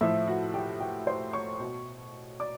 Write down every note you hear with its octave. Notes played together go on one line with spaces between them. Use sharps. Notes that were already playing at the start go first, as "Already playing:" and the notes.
A2 F3 E4 E5
F#4 F#5
G4 G5
G4 G5
C5 C6
C#5 C#6
B2
D5 D6